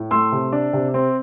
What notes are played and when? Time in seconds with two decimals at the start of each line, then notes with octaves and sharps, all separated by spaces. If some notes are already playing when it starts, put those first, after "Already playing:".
Already playing: A2
0.11 A3 C6 E6
0.32 C3
0.52 D4
0.73 C3
0.94 C4